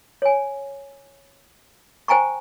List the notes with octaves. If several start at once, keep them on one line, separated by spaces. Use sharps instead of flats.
C#5 G#5
C5 G5 G#5 A#5 C#6